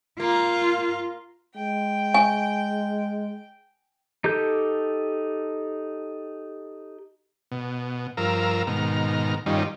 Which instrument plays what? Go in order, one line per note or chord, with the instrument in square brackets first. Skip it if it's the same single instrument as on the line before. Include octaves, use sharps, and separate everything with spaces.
[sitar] A#3 [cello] F4
[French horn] G#3 [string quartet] G5
[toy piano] G#5
[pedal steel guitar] D#4 G4 A4 G6
[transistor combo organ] B2
G2 F3 A#4 F5 A#5 E6
G#2 B2 D#3 A#5 F6
G2 D#3 G3 C#4 D#4 F4